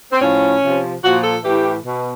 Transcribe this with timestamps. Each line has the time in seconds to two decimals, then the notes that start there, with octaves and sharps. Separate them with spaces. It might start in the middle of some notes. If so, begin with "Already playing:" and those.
0.12 C4
0.21 A2 F3 C#4
0.62 C3 F3
1.02 A#2 F3 F#4
1.24 A4
1.43 A2 E3 G4
1.85 B2